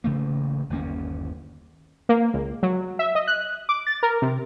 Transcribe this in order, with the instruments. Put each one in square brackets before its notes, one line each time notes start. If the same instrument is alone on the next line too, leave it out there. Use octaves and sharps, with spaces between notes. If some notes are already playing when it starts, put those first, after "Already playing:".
[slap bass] A1 C#3 A3 A#3
G1 D#2 A#3 C#4
[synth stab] A#3
C#2
F#3
E5
D#5
F#6
D6
A6
A#4
C3